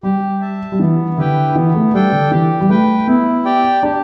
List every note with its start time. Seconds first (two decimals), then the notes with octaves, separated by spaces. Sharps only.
0.03 G3 G4
0.41 E5 A5
0.72 G3
0.79 E3 B3
1.17 D3 E4 G4 B4 G5
1.55 E3 B3
1.75 A3
1.94 G3 D4 A4 G5
2.12 D3
2.31 E3 G4
2.60 G3
2.69 A3 B4 G5
3.07 B3 E4
3.45 G4 D5 G5
3.83 D4 G4